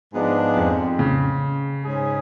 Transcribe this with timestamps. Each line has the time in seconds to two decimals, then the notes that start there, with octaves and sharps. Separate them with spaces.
0.13 G#2 F3 G#3 B3 D4
0.57 F2
0.99 C#3
1.84 G#2 G#3 C#4 G#4